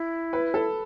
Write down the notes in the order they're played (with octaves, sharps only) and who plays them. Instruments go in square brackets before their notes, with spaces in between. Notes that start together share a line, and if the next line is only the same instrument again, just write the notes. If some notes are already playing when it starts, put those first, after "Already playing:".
Already playing: [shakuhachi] E4
[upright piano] B4
A4